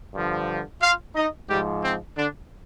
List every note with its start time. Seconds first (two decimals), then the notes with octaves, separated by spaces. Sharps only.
0.14 G2 D3 F3
0.81 F4 F5
1.15 D#4 D#5
1.49 G#2 F3 G3 G4
1.83 C4
2.16 D3 D4